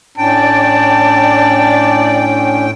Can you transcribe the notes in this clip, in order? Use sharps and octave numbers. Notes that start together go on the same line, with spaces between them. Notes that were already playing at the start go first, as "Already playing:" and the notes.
A2 C#4 D4 D5 G5 A5